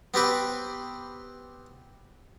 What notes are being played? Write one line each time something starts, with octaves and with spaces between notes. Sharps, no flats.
B3 C4 G4 B4